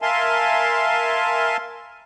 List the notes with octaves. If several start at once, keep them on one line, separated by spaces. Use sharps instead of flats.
A#4 E5 F5 G#5 A5 C6